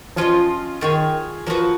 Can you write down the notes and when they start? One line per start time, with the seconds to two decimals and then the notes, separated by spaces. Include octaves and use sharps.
0.16 F3 C#4 F4 B4 D#5
0.81 D#3 F4 G#4 C#5
1.47 F3 A#3 D#4 F#4 B4